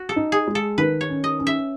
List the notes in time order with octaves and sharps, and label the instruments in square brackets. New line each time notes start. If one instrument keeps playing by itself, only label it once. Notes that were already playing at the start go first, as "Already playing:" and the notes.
Already playing: [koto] F#4
A4
[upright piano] D#4
[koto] G#4
[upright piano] G#3
[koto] A4
[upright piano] D#3 [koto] B4
[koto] C#5
[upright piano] C#4
[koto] D#5
[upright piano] C#4
[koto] E5